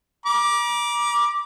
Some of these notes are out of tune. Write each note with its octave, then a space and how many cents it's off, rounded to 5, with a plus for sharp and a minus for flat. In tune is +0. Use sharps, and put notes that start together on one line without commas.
A#5 +45 D6 +0